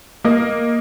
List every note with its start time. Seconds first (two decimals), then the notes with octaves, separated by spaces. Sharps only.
0.25 A#3 D#5